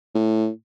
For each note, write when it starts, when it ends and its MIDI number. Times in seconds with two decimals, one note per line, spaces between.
0.15 0.49 45